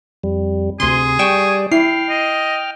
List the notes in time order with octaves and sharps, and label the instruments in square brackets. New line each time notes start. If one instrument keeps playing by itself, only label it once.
[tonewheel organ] F2 G3
[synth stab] D2 C6 [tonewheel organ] C3 [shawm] G#4
[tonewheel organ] G3 D5 [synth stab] G5 C#6 E7
[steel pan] E4 [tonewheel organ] G5 F6 [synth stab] C7
[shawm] D#5